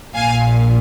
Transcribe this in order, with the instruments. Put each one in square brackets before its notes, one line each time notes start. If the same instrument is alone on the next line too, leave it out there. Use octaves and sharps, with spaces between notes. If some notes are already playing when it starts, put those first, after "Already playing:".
[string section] A#1 A#2 F5 G#5